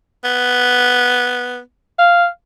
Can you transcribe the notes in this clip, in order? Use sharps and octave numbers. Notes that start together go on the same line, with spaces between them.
B3
F5